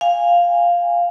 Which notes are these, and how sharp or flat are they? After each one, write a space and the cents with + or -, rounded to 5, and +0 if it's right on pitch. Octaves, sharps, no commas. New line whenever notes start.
F5 +0 G#5 -20